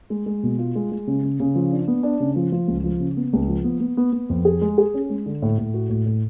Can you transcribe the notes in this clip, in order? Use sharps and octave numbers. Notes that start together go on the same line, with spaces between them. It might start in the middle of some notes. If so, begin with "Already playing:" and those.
G#3
G#3
B2
F4
G#3
G#3
C#3
C#3
C#3
F3
D4
B3
D4
C#3
F3
F3
C#2
F3
C#3
B3
C#2
F3
B3
B3
B3
B3
F2
G#4
G#3
G#4
C#4
G#3
D3
A2
A2
F#4
A2
A2